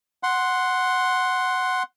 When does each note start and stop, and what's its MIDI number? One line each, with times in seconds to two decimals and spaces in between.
0.23 1.83 78
0.23 1.83 84